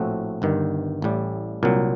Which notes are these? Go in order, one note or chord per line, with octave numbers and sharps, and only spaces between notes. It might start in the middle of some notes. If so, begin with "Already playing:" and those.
Already playing: A#1 A2 A3 C4 F#4
G1 G2 D#3
A1 A2 G3
C2 A#2 F#3